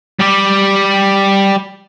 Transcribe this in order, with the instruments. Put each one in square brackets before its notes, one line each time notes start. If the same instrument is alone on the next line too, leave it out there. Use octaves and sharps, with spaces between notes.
[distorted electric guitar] G3 G4